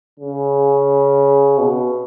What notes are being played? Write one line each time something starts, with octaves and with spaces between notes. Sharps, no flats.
C#3
B2